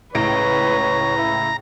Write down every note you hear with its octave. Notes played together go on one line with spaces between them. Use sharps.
C#2 A2 B4 C#5 A#5 D7
E4